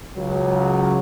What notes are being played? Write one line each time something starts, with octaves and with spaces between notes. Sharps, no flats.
C#2 C#3 F#3